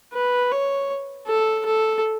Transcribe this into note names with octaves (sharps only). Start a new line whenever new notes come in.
B4
C#5
A4
A4